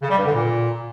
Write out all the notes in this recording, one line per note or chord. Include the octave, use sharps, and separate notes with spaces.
C#3
G3
G2
D3
A#2